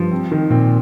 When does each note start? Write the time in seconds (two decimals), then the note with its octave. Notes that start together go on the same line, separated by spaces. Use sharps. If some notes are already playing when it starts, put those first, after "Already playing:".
Already playing: G2 F3
0.12 C4
0.31 D#3
0.50 A#2 C4